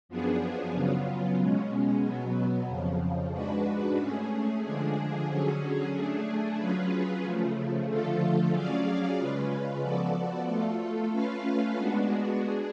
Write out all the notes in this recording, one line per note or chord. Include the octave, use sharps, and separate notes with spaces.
F#2 F3 B3 D4 G#4
C#3 F#3 B3 F4
B2 G#3 C#4
B2 F#3 B3
F2 C#3 F3
G#2 G#3 D4 F#4 B4
A3 C#4 G#4
D3 F3 G#3 D4 G#4
D3 F#3 C#4 G#4
A3 D4 G#4
F#3 C#4 F4 G#4 B4
C#3 F3 A3
D3 F3 A3 F4 A4
F#3 C#4 G#4 D5 F5
C#3 G#3 C#4 F4 B4
F3 B3 F#4 A4 D5
A3 F4 A4
A3 C#4 F4 B4 F5
G#3 B3 D4 F#4
D4 G#4